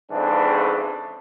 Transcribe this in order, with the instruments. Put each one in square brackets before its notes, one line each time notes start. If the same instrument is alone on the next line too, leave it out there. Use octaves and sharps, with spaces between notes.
[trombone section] F2 G#2 C#3 E3 D4